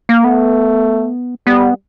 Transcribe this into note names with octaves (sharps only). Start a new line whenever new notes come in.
A#3
A3 B3
G3 B3